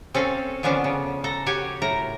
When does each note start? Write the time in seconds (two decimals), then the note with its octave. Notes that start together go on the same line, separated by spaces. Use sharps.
0.14 C4 C#4 A4 F5
0.63 D3 F3 B3 C#4 D4 F5
0.84 C#3
1.24 A4 A#5
1.46 F#4 G4 C#5 G#5
1.82 A2 A#4 A#5